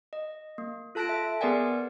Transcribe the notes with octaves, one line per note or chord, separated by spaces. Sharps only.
D#5
A#3
F4 A4 A5 F#6 A#6 D7
E5
B3 G#4 A#4 D5 F#5 G#5